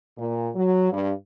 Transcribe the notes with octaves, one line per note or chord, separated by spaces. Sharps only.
A#2
F#3
G2